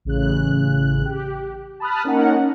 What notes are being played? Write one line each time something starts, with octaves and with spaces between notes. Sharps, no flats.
A1 C#3 F#6
G4
A5 B5 D#6 F6 F#6
A#3 C#4 D#4 A#4 F#5